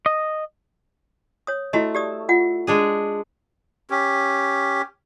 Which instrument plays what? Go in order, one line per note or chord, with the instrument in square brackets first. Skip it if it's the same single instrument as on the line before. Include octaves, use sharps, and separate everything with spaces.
[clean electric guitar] D#5
[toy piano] C#5 D#6
[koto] A3 [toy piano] E4 F#4 D#5
[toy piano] G4 D5 D#6
F4 F#5
[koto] G#3 D4 G#4
[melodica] C#4 G4